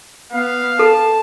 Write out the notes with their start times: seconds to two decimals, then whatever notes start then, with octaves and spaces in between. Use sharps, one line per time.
0.32 B3 F5
0.79 A4 A5